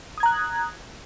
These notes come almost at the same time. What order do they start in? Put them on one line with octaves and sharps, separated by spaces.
D#6 G#6 A#5 F#6